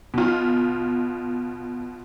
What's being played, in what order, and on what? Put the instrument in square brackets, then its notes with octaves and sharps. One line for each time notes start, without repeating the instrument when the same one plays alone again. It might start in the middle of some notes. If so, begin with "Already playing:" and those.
[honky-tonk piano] B2 F4